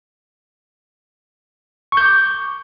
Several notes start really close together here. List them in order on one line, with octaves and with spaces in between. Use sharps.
C#6 G6 D6